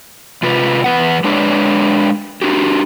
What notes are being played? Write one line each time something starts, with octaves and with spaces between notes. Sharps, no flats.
C3 F4 B4
E2 F3 B4 F#5
G#3 D4 B4 C#5 D5
D4 F#4 G4